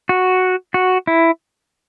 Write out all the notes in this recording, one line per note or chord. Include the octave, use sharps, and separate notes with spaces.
F#4
F#4
E4